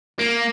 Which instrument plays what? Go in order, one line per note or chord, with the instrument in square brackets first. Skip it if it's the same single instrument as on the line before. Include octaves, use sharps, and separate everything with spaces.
[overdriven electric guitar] A#3